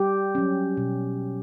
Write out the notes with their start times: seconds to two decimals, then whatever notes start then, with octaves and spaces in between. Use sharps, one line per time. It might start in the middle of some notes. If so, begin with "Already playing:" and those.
Already playing: G3 G4
0.35 F#3 C#4
0.77 B2